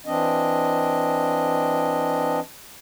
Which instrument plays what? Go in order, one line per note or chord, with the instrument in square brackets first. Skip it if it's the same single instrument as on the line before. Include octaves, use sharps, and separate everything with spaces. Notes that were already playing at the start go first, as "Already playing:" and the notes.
[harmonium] E3 C4 D4 D#5